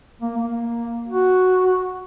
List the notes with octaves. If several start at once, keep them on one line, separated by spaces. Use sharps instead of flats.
A#3
A#3
F#4